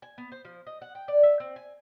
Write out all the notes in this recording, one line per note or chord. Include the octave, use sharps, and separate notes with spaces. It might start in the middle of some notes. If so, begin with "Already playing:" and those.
G#5
B3
C5
F3
D#5
F#5
G5
D5
E5
C4
G#5